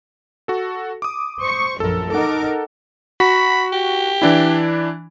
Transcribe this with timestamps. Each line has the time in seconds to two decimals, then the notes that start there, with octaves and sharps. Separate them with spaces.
0.48 F#4 A4
1.02 D6 D#6
1.41 C5 C#6
1.80 A#1 F#2 A4 A#4
2.10 D#4 A4 A#4 F#5 D6
3.20 F#4 B5
3.72 G4
4.22 E3 D4 E4